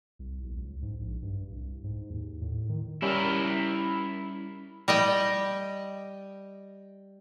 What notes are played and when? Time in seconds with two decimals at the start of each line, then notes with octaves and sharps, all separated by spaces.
0.19 C2
0.43 B1
0.56 C#2
0.82 G#2
1.00 A#1
1.23 G2
1.52 C2
1.84 G#2
2.10 D#2
2.41 A2
2.69 D#3
3.02 G3 C#4 E4 A#4
4.88 G3 D#5 G5